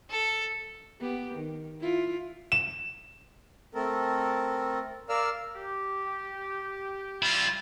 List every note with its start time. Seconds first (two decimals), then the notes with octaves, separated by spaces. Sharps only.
0.10 A4
1.00 B3 G4
1.34 D#3
1.80 E4 F4
2.52 E7
3.73 A3 C4 A4 A#4
5.09 A#4 D5 F5 E6 F6
5.55 G4
7.23 G3 E4 F4